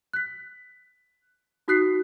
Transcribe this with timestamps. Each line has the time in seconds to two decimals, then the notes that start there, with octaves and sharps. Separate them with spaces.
0.13 F#6 B6
1.68 D#4 F#4 D#6 F#6 B6 C7